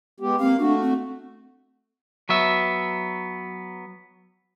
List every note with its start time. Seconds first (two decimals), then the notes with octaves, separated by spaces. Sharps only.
0.20 G#3 B3 G4
0.39 A#3 C4 F5
0.59 A3 D4 F#4
0.82 C4
2.29 F#3 B3 E5